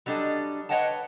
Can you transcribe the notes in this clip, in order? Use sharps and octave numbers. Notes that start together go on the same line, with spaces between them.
F#3 G3 D4 A4 D#5
B4 C#5 D#5 F#5 G5 A5